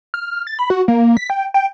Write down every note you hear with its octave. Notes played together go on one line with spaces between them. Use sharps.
F6
A6
B5
F#4
A#3
B6
G5
G5